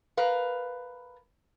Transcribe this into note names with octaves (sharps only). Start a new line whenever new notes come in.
A#4 B4 F5